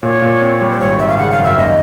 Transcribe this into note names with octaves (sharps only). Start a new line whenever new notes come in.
A#2 C#5
A#2
C4
G3
C5
G#1 C#5
G#1 E5
F5
C#3 F#5
F5
F#2
E5
D#2 D#5